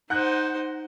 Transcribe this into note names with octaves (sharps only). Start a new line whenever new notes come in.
D#4 C5 F#5 F#6 G6